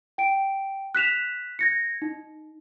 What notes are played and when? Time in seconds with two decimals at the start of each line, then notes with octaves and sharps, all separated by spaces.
0.18 G5 D7
0.95 F#6 B6 E7 F7
1.59 G#6 A#6 C#7
2.02 D#4